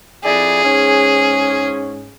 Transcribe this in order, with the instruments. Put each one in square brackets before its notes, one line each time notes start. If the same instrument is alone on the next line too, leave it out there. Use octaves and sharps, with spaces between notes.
[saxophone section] F2 E4 D5 [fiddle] G#4
[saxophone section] G#2 C#4